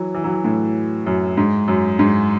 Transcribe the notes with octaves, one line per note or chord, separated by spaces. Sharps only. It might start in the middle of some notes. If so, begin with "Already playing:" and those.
Already playing: E3 F#3
E3
F#3
E3
A2
F#2
G#2
F#2
G#2